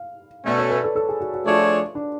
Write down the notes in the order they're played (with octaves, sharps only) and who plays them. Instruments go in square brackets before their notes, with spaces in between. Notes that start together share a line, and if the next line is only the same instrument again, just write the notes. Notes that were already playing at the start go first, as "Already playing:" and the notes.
Already playing: [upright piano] F5
[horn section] B2 A3 C#4 [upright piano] D5
[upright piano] C#5
B4
A4
A4
G#4
F#4
F#4
[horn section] F3 A3 D4 G#4 C#5 [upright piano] F4
[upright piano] D4